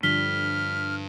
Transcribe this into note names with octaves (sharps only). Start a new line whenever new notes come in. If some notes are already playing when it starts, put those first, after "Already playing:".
G2 D3 F3 F6 B6 G7